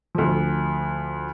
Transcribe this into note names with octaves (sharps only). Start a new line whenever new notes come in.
D2 F3